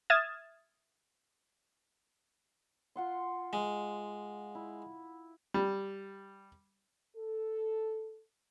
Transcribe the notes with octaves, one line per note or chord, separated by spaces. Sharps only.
E5 D#6 F6 G#6 A6 E7
F4 F#5 C6
G#3
E4
G3
A4